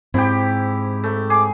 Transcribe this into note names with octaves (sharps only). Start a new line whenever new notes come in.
G#2 C4 E4 G4
A3
G#4 D6